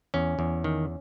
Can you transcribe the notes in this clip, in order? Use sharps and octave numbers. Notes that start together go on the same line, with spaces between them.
E2 C#4
E2
D#3